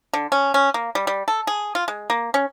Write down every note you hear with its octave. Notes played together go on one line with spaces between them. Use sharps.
D3
C#4
C#4
A#3
G3
G3
A4
G#4
F4
G#3
A#3
C#4